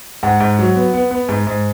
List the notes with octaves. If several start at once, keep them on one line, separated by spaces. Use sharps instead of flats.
G#2 F#5
G#2
F#3
B3
B3
B3
G#2
G#2